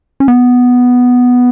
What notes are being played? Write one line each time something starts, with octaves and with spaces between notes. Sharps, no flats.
C#4
B3